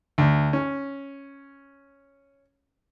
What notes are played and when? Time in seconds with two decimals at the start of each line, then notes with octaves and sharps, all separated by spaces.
0.18 D2
0.53 C#4